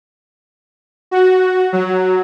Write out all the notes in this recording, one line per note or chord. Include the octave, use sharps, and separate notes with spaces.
F#4
F#3